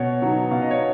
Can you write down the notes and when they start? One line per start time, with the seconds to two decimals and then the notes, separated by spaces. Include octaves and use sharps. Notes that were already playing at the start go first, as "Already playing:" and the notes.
Already playing: B2 C#5
0.22 F#3 B3 D#4
0.51 B2 F5
0.62 D#5
0.71 C#5